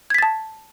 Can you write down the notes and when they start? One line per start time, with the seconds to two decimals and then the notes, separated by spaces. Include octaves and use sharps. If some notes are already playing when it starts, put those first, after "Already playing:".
0.10 G#6
0.14 B6
0.18 A6
0.23 A5